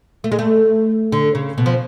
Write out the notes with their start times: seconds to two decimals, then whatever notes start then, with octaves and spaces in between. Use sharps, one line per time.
0.24 A3
0.32 G#3
0.39 A3
1.12 D3
1.35 C#3
1.58 B2
1.66 F3